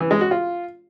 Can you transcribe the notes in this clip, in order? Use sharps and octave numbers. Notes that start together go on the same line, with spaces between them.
E3
G#3
F#4
F4